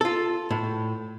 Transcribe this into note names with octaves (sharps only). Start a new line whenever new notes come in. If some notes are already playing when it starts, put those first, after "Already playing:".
F4 A4
A2